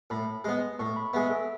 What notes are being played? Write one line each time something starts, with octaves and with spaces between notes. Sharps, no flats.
A2 B5
G#3 B3
A2 C#6
B5
G#3 B3 E5
A4